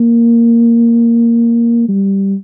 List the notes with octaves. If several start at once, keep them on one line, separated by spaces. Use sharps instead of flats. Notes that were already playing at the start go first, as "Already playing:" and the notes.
Already playing: A#3
G3